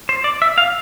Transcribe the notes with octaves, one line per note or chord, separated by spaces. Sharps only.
C5
D5
E5
F5